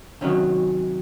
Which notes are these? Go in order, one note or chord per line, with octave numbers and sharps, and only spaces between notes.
C3 D#3 F#3 C#4